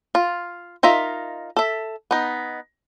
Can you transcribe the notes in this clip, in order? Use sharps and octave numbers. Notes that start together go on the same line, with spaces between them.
F4
D#4 F4 A#4 E5
A4 E5
B3 D#4